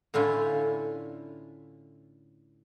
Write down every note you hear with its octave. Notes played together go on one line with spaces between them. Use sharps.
A2 D3 C#4 E4 F4